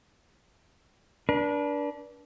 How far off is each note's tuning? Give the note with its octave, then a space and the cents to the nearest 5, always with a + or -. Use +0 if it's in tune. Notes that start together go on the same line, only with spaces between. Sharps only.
D4 -15 B4 -45